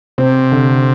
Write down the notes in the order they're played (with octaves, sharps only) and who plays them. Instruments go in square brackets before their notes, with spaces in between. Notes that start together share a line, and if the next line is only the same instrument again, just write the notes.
[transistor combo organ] C3 [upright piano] C4
[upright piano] D3